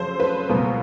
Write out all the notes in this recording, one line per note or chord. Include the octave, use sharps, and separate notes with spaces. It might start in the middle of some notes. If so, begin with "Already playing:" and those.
Already playing: F2 C#3 F#3 C5
B4
C#2 B2 F#3 B3 A#4